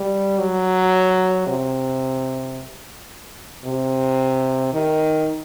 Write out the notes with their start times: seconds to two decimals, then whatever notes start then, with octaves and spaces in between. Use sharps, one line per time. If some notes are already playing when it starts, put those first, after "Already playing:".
Already playing: G3
0.39 F#3
1.47 C3
3.65 C3
4.73 D#3